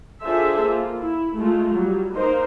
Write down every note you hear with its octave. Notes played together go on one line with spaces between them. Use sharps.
D4 F4 G#4 A4 C5 E5
A#3 F4
E4
G#3 A3 F4
F#3 G3
A#3 D#4 A#4 C5